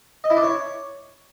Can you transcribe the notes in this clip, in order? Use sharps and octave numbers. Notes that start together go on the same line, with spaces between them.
D#5
E4
D4
C#5